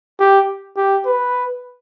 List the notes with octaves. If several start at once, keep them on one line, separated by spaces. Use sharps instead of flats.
G4
G4
B4